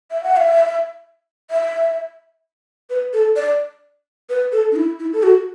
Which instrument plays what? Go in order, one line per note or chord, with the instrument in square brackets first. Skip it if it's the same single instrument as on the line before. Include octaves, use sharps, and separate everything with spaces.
[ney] E5
F#5
E5
E5
B4
A4
D5
B4
A4
D4
E4
E4
A4
F#4